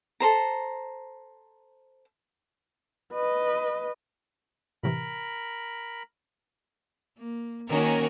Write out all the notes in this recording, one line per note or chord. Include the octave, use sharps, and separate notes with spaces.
A4 A#4 C5 A#5
B4 D#5
A2 C3 E3 A#4 B5
A#3
D#3 A#3 C#4 F#4 A#4